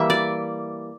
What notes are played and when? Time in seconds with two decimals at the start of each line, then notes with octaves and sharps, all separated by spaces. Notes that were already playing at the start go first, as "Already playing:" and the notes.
Already playing: E3 G3 A#3 E5
0.10 D5